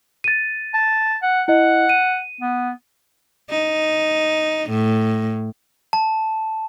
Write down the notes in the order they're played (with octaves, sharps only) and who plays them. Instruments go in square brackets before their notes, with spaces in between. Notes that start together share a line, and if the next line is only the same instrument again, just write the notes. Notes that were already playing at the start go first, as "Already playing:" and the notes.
[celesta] A6 D#7
[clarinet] A5
F#5
[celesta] E4 D#5 [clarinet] F#5
[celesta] D#7
[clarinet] B3
[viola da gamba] D#4
A2
[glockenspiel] A5